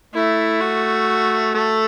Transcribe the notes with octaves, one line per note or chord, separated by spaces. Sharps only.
A3 E4
F#4
A3 A4